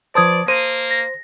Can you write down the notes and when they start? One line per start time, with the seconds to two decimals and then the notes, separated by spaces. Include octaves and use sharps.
0.15 F3 B4 C5 D5 A5 D#6 G#6
0.48 A#3 C5 D#7
0.91 A#6